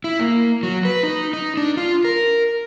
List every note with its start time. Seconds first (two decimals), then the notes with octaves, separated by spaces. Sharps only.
0.04 E4
0.19 A#3
0.63 F#3
0.85 B4
1.03 D#4
1.33 D#4
1.57 D4
1.77 F4
2.05 A#4